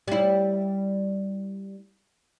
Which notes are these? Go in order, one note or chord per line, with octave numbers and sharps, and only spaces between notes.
G3 E4